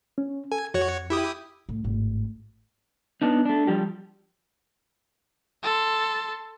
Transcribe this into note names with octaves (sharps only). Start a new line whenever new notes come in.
C#4
A4 G#5
F2 F#4 C#5
E4 G4 D#6
A2
G#1 A2
B3 D4 D#4
A3 D4
F3 G3 G4
A4 C6